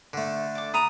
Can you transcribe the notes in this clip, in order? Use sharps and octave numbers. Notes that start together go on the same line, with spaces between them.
D3 A3
D5 D6
A#5 B5 D#6